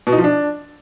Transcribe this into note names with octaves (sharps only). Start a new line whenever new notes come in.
B2
D#4
F3
D4